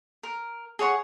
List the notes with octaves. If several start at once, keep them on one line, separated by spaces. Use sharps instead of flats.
A#4
G#4 C#5 F#5 C#6